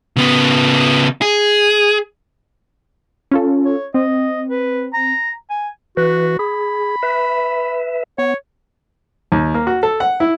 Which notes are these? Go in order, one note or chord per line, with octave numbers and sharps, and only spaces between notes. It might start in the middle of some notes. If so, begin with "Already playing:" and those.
C#3 B3
G#4
C#4 F4 A4
C#5
C4 D#5
B4
A#5
G#5
E3 F#4 B4
G#4 B5
B4 E5
B3 C#5
D#2
A#3
F#4
A4
F#5
E4